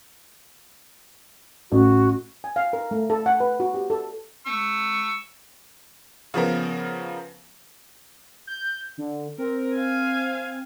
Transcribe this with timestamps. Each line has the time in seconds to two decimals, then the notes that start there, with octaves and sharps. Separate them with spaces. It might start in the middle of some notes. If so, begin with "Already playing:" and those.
1.72 A1 F#4
2.44 G#5
2.56 F5
2.73 A#4
2.91 A3
3.10 A4
3.26 F#5
3.40 B4
3.60 F#4
3.74 G4
3.90 A4
4.46 C#6 E6
6.34 C#3 F3 B3 A#4
8.47 G6
8.98 D3
9.38 C4 A#4
9.75 F5 G#5